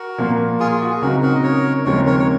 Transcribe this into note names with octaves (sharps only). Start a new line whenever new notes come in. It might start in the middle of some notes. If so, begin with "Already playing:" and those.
Already playing: F#4 A#4
A#2 F3 A#3
F4 G#4
F4
F#4
G#4
C#2 C#3 F#3 C4 D#4 F#4 A#4
F#4 A#4
D#5
A#4 C#5
D#2 C#3 F3 G#3 C4 A#4 C#5
A#4 C#5
C#5